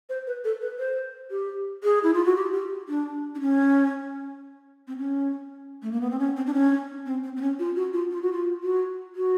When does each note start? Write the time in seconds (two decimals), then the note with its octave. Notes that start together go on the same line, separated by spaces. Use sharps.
0.09 C5
0.27 B4
0.44 A4
0.61 B4
0.79 C5
1.31 G4
1.83 G#4
2.03 E4
2.14 F4
2.25 F#4
2.36 G4
2.53 G4
2.89 D4
3.35 D4
3.41 C#4
4.88 C4
4.98 C#4
5.83 A3
5.92 A#3
6.01 B3
6.11 C4
6.19 C#4
6.37 C4
6.47 D4
6.54 C#4
7.06 C4
7.24 C4
7.37 C4
7.42 C#4
7.59 F4
7.76 F#4
7.93 F4
8.11 F4
8.22 F#4
8.32 F4
8.63 F#4
9.15 F#4